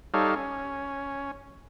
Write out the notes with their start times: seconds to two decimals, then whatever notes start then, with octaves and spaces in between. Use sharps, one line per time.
0.14 G3 D#4 A4 C#5 F5
0.36 C#4